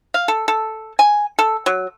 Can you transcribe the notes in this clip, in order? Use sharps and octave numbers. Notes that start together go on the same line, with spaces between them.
F5
A4
A4
G#5
A4
F#3